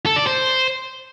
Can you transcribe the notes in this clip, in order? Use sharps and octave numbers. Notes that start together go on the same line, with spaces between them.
A4
D5
C5